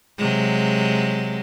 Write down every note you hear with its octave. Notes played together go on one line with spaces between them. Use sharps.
C3 F#3 G#3